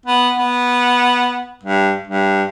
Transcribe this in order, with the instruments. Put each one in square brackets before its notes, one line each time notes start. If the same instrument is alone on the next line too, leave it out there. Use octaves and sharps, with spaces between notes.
[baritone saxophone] B3
B3
G2
G2